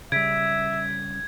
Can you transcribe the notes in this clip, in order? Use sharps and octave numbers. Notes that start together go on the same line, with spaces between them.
C#3 G3 E5 G#6 B6 D7